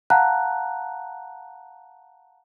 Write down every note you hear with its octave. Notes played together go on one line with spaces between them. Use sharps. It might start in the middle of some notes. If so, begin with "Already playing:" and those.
F5 F#5 A5 A#5 F#6